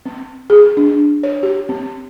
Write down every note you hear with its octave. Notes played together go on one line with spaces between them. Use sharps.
C4
G#4
D4
C#5
G4
C4